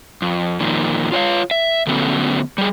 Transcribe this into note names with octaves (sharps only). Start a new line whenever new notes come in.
F2
F2 A#2 D#3
F4 C#5 D#5 F5
E5
D3 F#3 A3 B3 C#4
G3 G#4